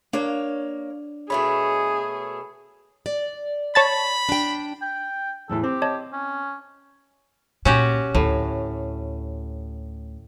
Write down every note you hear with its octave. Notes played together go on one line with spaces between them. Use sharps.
A#3 D4 C#5
B2 A3 G#4 C#5 B5
D5
C#5 A5 B5 A6
D4 G5
G5
E2 A2 E3 A4
C4 G4
C#5 D#5 A5
C#4
A#2 C#4 F#4 G4
D2 A2